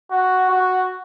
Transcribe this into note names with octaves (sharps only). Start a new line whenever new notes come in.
F#4
F#4